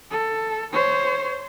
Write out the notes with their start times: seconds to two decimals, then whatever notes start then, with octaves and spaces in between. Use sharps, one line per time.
0.11 A4
0.73 C5 C#5